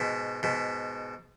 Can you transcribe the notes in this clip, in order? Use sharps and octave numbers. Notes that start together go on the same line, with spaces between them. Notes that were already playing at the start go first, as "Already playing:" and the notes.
Already playing: G#2 B2
G#2 B2